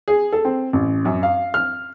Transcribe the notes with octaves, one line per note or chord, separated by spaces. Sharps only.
G#4
A4
C4
A1
F#2
F5
F6